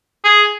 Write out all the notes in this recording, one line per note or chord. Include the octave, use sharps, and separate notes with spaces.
G#4